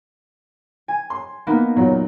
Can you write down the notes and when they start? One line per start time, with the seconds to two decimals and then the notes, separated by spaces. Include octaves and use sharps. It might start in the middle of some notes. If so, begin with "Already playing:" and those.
0.88 G#5
1.10 C6
1.47 A#3 B3 D#4
1.76 E2 A#2 F#3